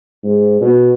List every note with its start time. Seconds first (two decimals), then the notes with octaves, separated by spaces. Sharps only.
0.24 G#2
0.61 B2